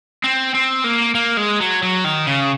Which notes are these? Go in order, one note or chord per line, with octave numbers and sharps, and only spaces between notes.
C4
C4
A#3
A#3
G#3
F#3
F#3
D#3
C#3